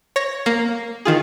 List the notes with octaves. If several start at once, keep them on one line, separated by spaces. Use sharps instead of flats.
C#5 A#6
A#3
D#3 F4 G#4